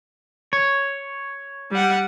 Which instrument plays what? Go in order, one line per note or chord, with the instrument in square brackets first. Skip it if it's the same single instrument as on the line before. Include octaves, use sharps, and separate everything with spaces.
[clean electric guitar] C#5
[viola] G3 F#5